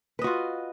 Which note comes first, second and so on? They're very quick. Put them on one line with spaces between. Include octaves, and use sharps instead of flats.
B4 D#5 F#4 F4